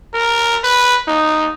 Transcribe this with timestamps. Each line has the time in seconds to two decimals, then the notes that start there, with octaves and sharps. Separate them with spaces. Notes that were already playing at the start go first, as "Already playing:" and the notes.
0.14 A#4
0.63 B4
1.08 D#4